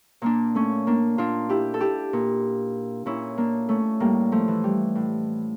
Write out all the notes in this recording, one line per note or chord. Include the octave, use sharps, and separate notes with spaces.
A#2 A#3 D4
A3 C#4
A#3 D4
A#2 D4 F4
E4 G4
A4
E4 G4
A#2
A#2 C#4 E4
A#3 D4
A3 C#4
A2 G3 A#3
F3 A3
E3
G3
A2